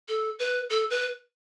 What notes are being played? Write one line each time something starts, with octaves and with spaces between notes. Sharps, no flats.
A4
B4
A4
B4